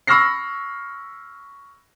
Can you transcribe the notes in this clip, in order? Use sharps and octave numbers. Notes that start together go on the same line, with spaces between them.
B5 C#6 E6 F6 A#6 C7